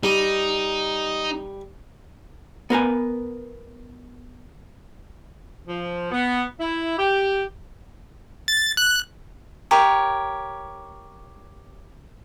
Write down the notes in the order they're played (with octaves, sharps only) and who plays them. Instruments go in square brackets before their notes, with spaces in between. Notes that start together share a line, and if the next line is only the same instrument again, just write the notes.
[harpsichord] G3 [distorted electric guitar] D#4
[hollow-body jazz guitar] B3 A#4 B4 G#5
[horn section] F3
B3
E4
G4
[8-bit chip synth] A6
F#6
[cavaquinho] G4 A#4 C#5